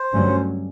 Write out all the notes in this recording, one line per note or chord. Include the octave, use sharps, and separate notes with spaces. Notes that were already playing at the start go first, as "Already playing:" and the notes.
Already playing: C5
G2 D3 F#3 A3 C#4